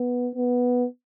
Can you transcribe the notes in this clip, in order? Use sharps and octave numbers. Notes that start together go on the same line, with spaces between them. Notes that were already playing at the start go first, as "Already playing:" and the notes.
Already playing: B3
B3